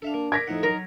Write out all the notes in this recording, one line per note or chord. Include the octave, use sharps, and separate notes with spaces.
D4 A4 E5 F5
A#3
A#4 D5 G#6 A#6 B6
F2 A2 D#4 F#5
F#3 A#4